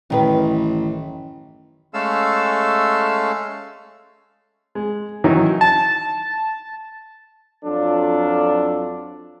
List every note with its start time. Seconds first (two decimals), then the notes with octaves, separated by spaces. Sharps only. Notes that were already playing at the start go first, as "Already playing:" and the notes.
0.10 A1 F#2 D#3 B4
1.94 G#3 A3 C#4 A4 F5 E6
4.75 G#3
5.24 D#3 E3 F#3 C#4 D#4
5.61 A5
7.64 F2 F#3 D4 F4 A4